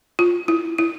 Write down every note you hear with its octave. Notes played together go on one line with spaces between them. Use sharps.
F4
E4
E4